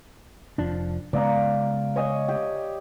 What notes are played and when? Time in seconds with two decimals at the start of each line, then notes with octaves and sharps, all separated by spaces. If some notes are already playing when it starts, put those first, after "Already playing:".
0.58 F1 F3 D4
1.13 C#3 G#3 B3 D5 F5 A#5
1.96 C#5 D#5 G#5
2.28 G4